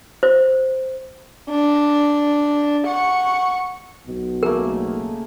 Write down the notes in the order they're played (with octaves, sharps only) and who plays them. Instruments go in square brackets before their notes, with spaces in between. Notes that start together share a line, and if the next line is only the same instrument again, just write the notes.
[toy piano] C5
[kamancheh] D4
F#5 C#6
[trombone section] B1 B2
[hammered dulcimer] C#3 A3 A#3 [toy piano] A#4